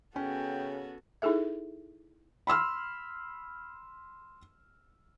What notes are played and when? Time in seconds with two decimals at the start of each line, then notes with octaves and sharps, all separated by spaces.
0.16 C#3 B3 C#4 F#4 A4 G5
1.22 D#4 E4 G#4 A4 E5
2.47 B5 C6 E6 F6